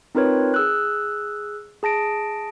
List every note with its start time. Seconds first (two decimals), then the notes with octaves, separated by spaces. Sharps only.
0.15 C4 D#4 F4 A#4 B4 C#5
0.54 G#4 E6 F#6
1.83 G#4 A5 A#6 D7